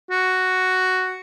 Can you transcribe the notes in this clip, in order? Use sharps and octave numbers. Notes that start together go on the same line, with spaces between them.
F#4